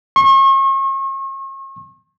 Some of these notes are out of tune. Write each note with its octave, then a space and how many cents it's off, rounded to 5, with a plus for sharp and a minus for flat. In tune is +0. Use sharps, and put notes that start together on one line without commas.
C#6 -40